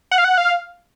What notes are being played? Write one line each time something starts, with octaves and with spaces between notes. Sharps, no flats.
F#5
F5
F#5
F5